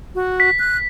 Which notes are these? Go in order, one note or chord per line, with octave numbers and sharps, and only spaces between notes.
F#4
B6
F#6